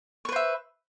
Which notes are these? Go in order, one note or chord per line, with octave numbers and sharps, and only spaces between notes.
B4 C5 E5 C#6